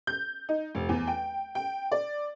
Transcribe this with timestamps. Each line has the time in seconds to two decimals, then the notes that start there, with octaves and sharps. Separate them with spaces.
0.07 G6
0.49 D#4
0.75 F1
0.89 E2
1.07 G5
1.55 G5
1.92 D5